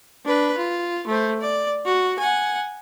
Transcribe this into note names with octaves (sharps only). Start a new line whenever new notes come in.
D4 B4
F4
A3 C5
D5
F#4
F#5 G#5